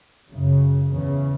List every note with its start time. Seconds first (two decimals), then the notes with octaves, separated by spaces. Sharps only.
0.30 F#2 C#3
0.92 E2 C#3